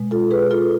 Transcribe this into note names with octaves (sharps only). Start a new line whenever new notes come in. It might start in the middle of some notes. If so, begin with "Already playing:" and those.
Already playing: B2 G#3
F4 A4
G#4 B4
F4 A4